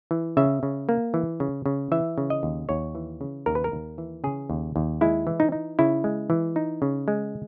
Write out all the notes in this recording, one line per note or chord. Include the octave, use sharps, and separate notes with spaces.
E3
C#3 E5
C#3
A#3
E3
C#3
C#3
E3 E5
C#3
D#5
D#2
D#2 C#5
E3
C#3
D#2 A#4
B4
A#4
D#2
E3
C#3 G#4
D#2
D#2
G#3 E4
E3
D#4
D#4
C#3 E4
G#3
E3
D#4
C#3
G#3